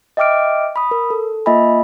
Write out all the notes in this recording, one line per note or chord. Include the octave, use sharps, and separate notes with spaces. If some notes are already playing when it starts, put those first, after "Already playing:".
D#5 E5 G5 D6 F6 D7
B5 D#6
A#4
A4
A#3 F4 D#5 E5 G#5 B5